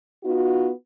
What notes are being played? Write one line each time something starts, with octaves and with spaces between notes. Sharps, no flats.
B3 D#4 F4 F#4